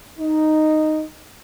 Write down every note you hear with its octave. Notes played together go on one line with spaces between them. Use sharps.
D#4